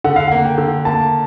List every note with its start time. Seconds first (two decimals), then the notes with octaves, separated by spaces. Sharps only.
0.04 D3 F#5
0.16 F5
0.28 A#3 F#5
0.45 G5
0.58 D3
0.85 A#3 A5